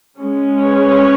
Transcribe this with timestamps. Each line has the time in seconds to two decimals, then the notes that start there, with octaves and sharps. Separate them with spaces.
0.21 G#3 C#4
0.63 B4 C#5